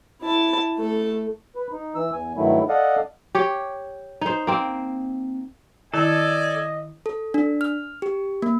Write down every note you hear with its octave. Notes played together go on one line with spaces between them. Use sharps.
E4 A5
A3 A4
B4
D#4
E3 E6
E2 G#5
G2 D#3 F#3 A3 E4
A4 D5 D#5 F5 F#5
G4 C#5
D#4 C5
A#3 C4
D#3 E4 A4 D5 D#5 G#5
A4
D4
F6
G4
A#3